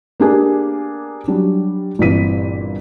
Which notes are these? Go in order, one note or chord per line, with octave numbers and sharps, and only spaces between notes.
A#3 B3 D4 G4 G#4 G#5
F#3 G3 D4
G1 A#2 E3 C4 B6 D#7